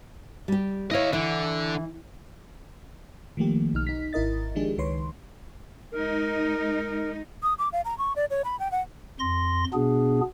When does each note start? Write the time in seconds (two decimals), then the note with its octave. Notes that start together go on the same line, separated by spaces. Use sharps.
0.48 G3 G4
0.91 E4 C#5 D#5 F5
1.13 D3 E3
3.37 D#3 F3 A3 A#3 G4
3.74 B1 D#4 F6
3.87 D#4 B6
4.13 G#1 E4 A#4 D#5 A6
4.55 D#3 F3 G#3 D4 G4 G#4
4.78 C#2 D#3 B4 C#5 C6
5.92 G#3 D#4 A#4
7.43 D#6
7.59 D6
7.72 F5
7.85 A#5
7.98 C#6
8.16 D5
8.30 C#5
8.45 B5
8.59 G5
8.72 F#5
9.19 F2 C6 A#6
9.73 B2 B3 D4 G#4